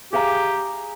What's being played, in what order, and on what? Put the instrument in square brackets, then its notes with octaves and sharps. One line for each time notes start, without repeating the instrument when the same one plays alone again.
[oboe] G4 [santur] G#4 F5 A#5